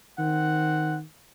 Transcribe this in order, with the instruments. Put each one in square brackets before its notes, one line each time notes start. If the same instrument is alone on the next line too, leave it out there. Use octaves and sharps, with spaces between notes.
[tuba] D#3 [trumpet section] C4 F#5